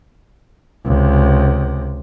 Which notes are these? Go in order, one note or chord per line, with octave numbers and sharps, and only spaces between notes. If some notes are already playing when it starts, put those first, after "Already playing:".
C#2 C3